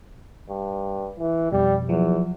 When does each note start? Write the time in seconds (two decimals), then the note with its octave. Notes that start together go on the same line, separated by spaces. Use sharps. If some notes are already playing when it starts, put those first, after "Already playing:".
0.49 G2
1.19 E3
1.52 F2 B2 G3
1.89 E2 F3 F#3